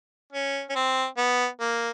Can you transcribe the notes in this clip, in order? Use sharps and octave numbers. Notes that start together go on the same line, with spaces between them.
C#4
C#4
C4
B3
A#3